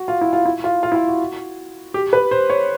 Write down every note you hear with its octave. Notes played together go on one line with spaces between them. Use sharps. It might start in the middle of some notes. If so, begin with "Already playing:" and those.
Already playing: F#4
F4
E4
F4
E4
F4
F4
E4
F4
F#4
G4
B4
C5
C#5